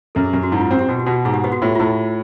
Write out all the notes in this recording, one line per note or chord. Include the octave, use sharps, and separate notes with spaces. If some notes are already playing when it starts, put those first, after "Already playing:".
F#2 A4
G#4
F#2 G4
F#4
G#2 E4
F4
C4 F#4
G4
B2 F#4
F#4
B2 G4
G#2 G#4
G4
B3 G4
F#4
A2 F4
F4
A2 E4